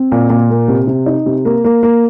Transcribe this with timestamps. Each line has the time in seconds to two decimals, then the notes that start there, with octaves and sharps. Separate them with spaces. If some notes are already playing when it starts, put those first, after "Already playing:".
Already playing: C4
0.12 A#2
0.30 A#2
0.50 A#3
0.68 C3
0.87 C3
1.06 D#4
1.26 C3
1.45 A#3
1.64 A#3
1.83 A#3